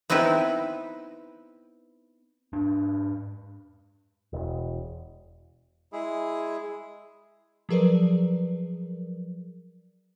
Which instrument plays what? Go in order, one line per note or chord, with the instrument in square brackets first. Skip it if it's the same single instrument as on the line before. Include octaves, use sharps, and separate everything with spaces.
[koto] B3 C4 D#4 E4 B4
[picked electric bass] G#2 D4
E1
[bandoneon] G#3 E4 G#4
[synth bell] F3 F#3 G#4 A#4 B4 D5